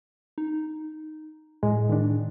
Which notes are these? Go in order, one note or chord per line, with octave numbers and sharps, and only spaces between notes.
D#4
A2 G#3
D#3 D4